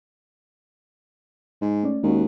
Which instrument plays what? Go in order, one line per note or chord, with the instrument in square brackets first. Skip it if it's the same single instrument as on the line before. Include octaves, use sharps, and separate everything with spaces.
[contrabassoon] G#2
[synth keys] A3 C#4 D5
[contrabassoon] D#2 [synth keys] G#3 C#4 F#4